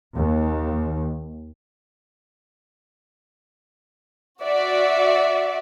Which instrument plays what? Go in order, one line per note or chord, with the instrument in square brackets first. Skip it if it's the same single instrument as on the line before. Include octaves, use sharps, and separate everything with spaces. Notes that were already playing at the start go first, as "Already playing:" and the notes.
[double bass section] D#2
[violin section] F#4 D5 E5 F#5